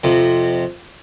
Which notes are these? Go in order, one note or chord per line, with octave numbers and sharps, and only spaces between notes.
F2 C3